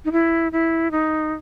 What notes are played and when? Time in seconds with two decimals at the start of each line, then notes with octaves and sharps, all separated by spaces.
0.05 D#4
0.12 E4
0.52 E4
0.91 D#4